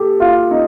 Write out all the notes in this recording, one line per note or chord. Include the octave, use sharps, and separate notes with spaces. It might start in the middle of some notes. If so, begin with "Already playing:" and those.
Already playing: G4 A4
F4
D#4